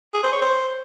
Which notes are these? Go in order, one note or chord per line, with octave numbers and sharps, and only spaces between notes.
G#4
C5
C#5
C5